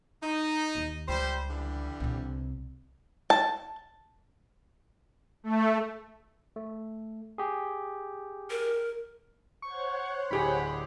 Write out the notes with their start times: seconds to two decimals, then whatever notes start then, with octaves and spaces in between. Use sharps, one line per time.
0.23 D#4
0.75 D#2
1.08 C#2 G3 C5
1.50 D3 E3 G3
2.00 C2 C3
3.30 A5
5.44 A3
6.56 A3
7.38 G4 G#4
8.51 A#4
9.62 C5 C#5 F#5 C#6
10.31 D1 G4 G#4 B5